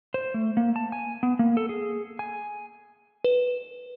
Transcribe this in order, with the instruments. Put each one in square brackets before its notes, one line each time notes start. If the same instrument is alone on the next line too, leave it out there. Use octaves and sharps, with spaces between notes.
[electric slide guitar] C5
A3
A#3
A5
G#5
B3
A#3
A4
G#4
G#5
[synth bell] B4